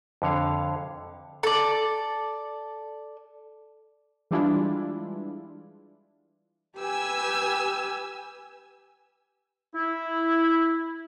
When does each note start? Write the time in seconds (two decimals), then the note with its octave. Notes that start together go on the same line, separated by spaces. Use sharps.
0.22 F2 D3 C#5 F5
1.43 A4 D5
4.31 E3 G3 G#3 D4 E4 F4
6.78 G4 B4 G#5 E6
9.75 E4